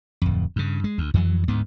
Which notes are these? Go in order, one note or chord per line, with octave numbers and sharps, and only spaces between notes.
D1 F2
G2 C#3
G#3
D2
F2 E3 F#3
D2 G#2 B3